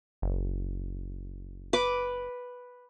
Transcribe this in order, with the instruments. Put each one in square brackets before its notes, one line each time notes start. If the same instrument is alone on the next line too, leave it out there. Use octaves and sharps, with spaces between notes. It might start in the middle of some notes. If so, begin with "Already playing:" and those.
[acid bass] F#1
[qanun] B4 D6